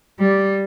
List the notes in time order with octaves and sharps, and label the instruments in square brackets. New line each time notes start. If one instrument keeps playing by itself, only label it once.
[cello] G3